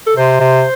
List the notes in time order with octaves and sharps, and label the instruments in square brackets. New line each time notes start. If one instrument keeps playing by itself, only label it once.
[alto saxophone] A4
[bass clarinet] C3 [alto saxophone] C5
[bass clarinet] C3